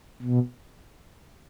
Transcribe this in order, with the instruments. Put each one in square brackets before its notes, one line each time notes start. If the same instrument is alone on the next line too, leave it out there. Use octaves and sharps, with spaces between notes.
[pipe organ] B2